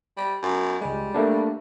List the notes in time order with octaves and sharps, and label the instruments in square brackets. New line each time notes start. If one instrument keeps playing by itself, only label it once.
[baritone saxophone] G3
F#2
[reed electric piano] C#2 G#3 [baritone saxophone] G3
[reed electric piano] A3 A#3 D4